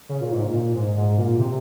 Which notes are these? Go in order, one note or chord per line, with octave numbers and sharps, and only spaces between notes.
C#3
A#2
G#2
A#2
A#2
G#2
G#2
A#2
C3